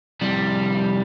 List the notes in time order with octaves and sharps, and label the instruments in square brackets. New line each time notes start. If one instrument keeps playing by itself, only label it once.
[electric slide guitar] C3 F3 C4 E4 G4 [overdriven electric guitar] G3